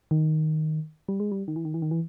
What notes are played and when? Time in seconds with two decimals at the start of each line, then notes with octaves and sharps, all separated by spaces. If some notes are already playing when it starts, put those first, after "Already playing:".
0.11 D#3
1.08 G3
1.20 G#3
1.32 G3
1.48 D#3
1.56 E3
1.65 D#3
1.74 E3
1.82 D#3
1.91 E3